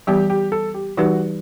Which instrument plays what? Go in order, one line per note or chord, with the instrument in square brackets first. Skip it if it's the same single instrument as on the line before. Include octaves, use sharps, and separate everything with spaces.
[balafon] E3 G3 B3 [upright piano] G4
[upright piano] G4
A4
G4
[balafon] E3 G3 D#4 G4 B4 [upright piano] F#4